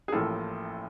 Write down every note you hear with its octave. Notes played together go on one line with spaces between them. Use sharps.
G#4
A1 A2 F3 A#3 A4